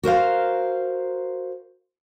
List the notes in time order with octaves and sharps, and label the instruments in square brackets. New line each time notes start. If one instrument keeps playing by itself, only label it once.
[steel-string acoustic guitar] F#4 A#4 C5 F5